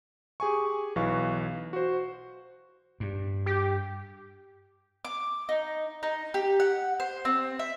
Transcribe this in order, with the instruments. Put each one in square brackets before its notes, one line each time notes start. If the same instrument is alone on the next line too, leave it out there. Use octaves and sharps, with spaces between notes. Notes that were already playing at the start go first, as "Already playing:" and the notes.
[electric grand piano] G4 G#4 G#5 C#6
B1 E3 F5 C#6
F#4 C5
[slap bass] G2
[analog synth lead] G4
[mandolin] D6
D#4
D#4
G4
F#5
C5
C4
E5